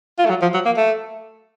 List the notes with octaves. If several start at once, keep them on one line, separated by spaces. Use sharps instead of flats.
F4
A3
F#3
F3
F#3
A#3
A3